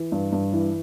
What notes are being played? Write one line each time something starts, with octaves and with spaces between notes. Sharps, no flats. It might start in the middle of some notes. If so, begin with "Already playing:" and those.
Already playing: E3
G2
G2
E3